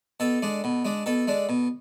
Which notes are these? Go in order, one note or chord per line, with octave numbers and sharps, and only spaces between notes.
B2 A4
G#3 D4
B2
G#3 D4
B2 A4
G#3 D4
B2